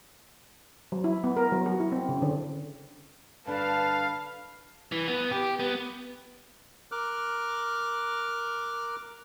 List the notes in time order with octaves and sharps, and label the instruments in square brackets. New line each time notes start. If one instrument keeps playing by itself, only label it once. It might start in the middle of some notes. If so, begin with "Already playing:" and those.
[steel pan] F#3
E4
B3
A#4
F#3
F#4
E4
C4
C#3
D3
[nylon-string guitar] G2 D3 D4 [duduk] B4 [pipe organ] F5 [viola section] A5
[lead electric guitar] E3
B3
G4
B3
[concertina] A#4 D6 F6 F#6